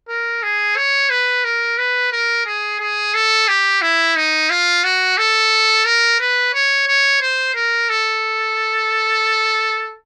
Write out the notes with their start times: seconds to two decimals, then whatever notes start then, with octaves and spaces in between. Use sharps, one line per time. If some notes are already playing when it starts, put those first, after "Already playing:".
0.09 A#4
0.43 G#4
0.76 C#5
1.10 B4
1.44 A#4
1.78 B4
2.12 A#4
2.46 G#4
2.80 G#4
3.14 A4
3.48 G4
3.82 E4
4.16 D#4
4.50 F4
4.84 F#4
5.17 A4
5.85 A#4
6.20 B4
6.53 C#5
6.87 C#5
7.21 C5
7.55 A#4
7.89 A4